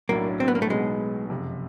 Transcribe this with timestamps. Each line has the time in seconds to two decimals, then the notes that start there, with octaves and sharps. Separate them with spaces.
0.09 B1 A2 F#3 A3 A#3 D4
0.40 C4
0.48 B3
0.55 A#3
0.62 A3
0.70 B1 B2 F#3 G#3 B3 D#4
1.30 F#1 F2 C3